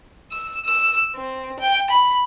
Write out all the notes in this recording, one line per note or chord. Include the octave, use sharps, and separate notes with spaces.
E6
E6
C4
G5
B5